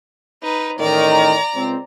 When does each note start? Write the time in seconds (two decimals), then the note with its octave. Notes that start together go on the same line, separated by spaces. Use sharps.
0.42 D#4 B4
0.80 A1 A2 D#3 D5 A#5
1.55 C#2 C4